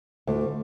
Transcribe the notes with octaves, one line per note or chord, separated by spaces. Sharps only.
D2